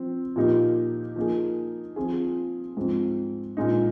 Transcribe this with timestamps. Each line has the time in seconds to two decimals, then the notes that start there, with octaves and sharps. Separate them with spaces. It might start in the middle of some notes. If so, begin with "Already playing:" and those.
Already playing: F3 C4
0.36 A#2 F3 A#3 D#4 G4
1.16 F3 A#3 D#4 G#4
1.96 F3 C4 F4 G#4
2.77 G#2 F3 C4
3.57 A#2 G#3 D#4